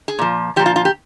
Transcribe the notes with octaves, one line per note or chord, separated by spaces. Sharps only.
G#4
A#2 F3
A#2 F3 G4
F4
F4
G4